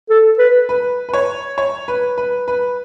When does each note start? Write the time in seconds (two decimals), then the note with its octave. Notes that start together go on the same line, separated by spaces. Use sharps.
0.10 A4
0.39 B4
0.69 B4
1.09 B4
1.14 C#5
1.58 C#5
1.88 B4
2.18 B4
2.48 B4